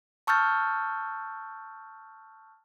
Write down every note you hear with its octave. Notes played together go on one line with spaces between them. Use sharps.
A5 C#6 E6 F6 G6 A6